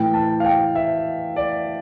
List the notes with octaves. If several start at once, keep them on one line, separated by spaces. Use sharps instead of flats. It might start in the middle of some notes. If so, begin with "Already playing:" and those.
Already playing: A2 E3 G5
A5
F5
G5
E5
D5